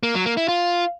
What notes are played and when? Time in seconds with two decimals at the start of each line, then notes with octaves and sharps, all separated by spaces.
0.03 A#3
0.15 F#3
0.26 A#3
0.37 E4
0.48 F4